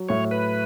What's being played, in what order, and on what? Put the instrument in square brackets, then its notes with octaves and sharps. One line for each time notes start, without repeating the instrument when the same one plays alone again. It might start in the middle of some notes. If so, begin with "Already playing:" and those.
Already playing: [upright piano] F#3
[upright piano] A2 [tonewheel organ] C#5
[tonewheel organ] B4